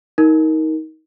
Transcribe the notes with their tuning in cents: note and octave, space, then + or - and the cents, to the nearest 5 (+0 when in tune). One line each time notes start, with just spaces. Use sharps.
D#4 +25 A#4 +0